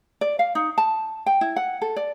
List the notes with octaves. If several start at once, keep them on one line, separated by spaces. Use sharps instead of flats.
D5
F5
D#4
A5
G5
E4
F#5
A4
D5